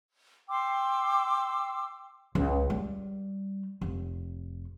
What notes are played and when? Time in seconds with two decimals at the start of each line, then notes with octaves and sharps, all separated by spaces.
0.49 G5 C6 D6 E6
2.35 C#2
2.70 G3
3.81 F1